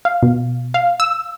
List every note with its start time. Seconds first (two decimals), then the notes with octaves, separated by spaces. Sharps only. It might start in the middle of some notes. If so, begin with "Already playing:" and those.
0.05 F5
0.23 B2
0.74 F5
1.00 E6